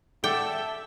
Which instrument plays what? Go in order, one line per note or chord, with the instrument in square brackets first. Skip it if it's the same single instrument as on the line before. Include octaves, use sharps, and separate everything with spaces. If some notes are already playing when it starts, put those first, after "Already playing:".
[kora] A4 D5 F#5 [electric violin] E5 A5 [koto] G5